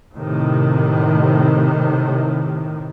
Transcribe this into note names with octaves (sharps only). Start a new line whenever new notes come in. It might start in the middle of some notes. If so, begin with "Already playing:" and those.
A2 C3 D#3